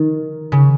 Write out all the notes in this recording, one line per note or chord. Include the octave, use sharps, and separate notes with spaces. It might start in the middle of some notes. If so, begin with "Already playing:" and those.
Already playing: D#3
C#3